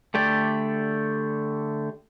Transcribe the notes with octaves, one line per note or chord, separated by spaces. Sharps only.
D3 A3 G4 D5